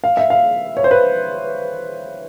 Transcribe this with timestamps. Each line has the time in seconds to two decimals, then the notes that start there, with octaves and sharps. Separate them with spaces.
0.04 F5
0.17 E5
0.30 F5
0.77 C#5
0.84 C5
0.91 B4